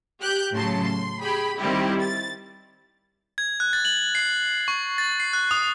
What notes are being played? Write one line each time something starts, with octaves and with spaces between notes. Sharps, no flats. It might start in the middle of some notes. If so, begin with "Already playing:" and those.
G4 F#6 G6
A2 C#3 F#3 A5 C6
C6
G4 G#4 B5
D#3 G3 C4 E4 G4
A6
G#6
F#6
A6
F#7
C7
C#6
A6
C7
F#6
D#6